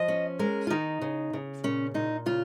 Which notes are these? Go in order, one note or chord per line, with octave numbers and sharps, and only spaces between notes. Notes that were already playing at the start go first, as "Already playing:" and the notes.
Already playing: F3 D#5
C#4
G#3 A#4
F4
D#3 D#4
C#3
C#3
A#2 C#4
A#2 D#4
C#3 F4